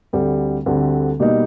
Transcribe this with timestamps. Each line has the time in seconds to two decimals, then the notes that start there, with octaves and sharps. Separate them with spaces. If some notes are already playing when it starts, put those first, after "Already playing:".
0.13 D2 D3 G3 C4
0.66 D2 D3 G3 C4
1.20 B2 G3 A#3 D#4